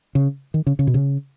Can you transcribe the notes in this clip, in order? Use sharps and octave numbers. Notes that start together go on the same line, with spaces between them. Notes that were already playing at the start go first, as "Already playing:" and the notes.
C#3
D#3
C#3
C#3
B2
C#3